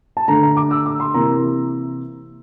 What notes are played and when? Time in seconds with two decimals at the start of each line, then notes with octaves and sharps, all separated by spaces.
0.17 A5
0.28 D3 A3 D4 A#5
0.43 A#5
0.57 D6
0.71 E6
0.86 D6
1.00 C6
1.14 C3 E3 A#3 E4 A#5